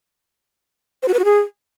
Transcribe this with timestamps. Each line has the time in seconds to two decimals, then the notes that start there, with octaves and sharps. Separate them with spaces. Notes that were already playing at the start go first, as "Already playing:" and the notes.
1.03 C5
1.08 F#4
1.14 B4
1.19 F#4
1.25 G#4